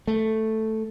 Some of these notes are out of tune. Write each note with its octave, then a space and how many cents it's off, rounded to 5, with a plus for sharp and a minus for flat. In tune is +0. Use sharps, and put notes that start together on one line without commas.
A3 +0